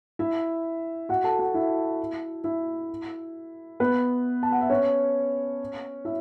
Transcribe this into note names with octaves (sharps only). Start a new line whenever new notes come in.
E4 E5
F#4 F#5
A4 A5
F#4 F#5
E4 E5
E4 E5
B3 B4
A5
F#5
E5
C#4 C#5
E4 E5